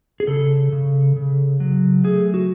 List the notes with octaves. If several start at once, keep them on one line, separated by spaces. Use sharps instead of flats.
G#4
C#3 A4
C#3
C#3
F#3
A3 G#4
F#4